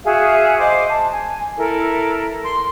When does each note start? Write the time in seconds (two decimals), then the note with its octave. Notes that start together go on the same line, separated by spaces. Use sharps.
0.03 F#4 G#4 E5 F5
0.58 C5 D#5 D6
0.89 A5
1.11 G#5
1.57 E4 A4 A#4
2.43 C6